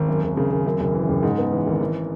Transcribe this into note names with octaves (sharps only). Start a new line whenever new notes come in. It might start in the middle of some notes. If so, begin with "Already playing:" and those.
Already playing: G#1
F#2
G#1
C#3
G#1
F#2
F#1
E3
F#1
G#2
B3
E3
G#1
E3